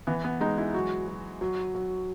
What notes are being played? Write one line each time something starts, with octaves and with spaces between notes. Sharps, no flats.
E3 B3
B3
G#3 D#4
E4
F#3 F#4
F#3
F#3
F#3